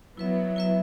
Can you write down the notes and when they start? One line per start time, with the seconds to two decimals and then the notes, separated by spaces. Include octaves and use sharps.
0.17 F#3 B3 E4 B4 E5
0.56 E4 B4 E5